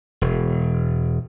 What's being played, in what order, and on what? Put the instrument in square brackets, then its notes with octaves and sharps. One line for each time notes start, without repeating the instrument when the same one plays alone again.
[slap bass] E1